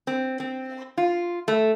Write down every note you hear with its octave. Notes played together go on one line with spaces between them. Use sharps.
C4
C4
F4
A3